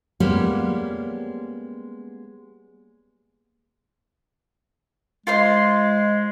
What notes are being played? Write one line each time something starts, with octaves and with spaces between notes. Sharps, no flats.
G3 G#3 A#3 B3 C#4 G4
G#3 F4 C5 C6